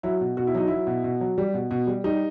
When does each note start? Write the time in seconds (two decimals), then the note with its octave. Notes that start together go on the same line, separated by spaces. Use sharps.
0.03 F#3 E4
0.21 B2
0.37 B2 F#4
0.47 E4
0.54 F#3 D#4
0.68 F#3 E4
0.87 B2
1.04 B2
1.21 F#3
1.38 G3
1.54 B2
1.71 B2
1.87 G3
2.04 G3 D#4